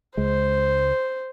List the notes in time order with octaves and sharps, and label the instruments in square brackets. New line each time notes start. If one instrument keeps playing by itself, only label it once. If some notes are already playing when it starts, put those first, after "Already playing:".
[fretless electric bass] C#2 G#3 [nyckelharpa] C5